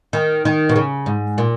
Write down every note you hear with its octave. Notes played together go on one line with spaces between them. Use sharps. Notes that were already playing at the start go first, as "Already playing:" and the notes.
D#3
D#3
B2
C#3
G#2
A#2